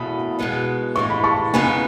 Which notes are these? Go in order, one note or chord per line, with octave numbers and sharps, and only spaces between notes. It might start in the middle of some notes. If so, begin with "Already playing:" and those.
Already playing: E2 B2 A3 B5 D#6
B2 G#3 B3 D#4
A2 E3 G#3 D#4 C#6
B5
A5 C#6
C#3 G#3 B3 D#4 G#5 B5